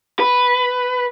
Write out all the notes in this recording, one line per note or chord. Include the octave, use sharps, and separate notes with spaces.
B4